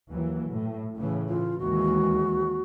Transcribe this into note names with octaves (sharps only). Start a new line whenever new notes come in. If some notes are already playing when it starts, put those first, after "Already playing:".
D#2 E3 F#3
A2
A2 C#3 E3
F4
D#2 E3 G#3 F#4